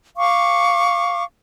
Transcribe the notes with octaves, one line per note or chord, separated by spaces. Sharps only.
F5 C#6 D6